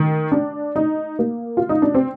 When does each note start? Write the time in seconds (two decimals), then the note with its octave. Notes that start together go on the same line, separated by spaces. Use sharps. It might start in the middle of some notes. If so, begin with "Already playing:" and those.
Already playing: D#3
0.32 D4
0.76 D#4
1.19 A#3
1.57 F4
1.69 D#4
1.82 D4
1.94 C4